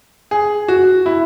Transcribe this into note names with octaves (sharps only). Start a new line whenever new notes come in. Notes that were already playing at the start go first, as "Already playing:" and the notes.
G#4
F#4
E4